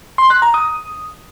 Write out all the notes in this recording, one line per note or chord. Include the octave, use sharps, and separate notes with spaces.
C6
F#6
A#5
D#6